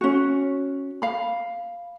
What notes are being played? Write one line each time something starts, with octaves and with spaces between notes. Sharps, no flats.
C#4 F#4
F5 B5